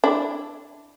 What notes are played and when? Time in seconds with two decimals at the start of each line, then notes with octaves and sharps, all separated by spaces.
0.04 D4 E4